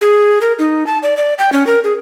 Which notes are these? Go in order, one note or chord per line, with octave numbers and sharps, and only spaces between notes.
G#4
A#4
D#4
A5
D5
D5
G5
C#4
A#4
G#4